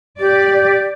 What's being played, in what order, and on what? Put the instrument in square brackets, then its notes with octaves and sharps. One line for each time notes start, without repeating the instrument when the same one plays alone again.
[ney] G4 [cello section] D5